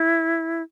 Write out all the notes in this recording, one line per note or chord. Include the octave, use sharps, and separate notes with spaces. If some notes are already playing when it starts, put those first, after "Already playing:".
Already playing: E4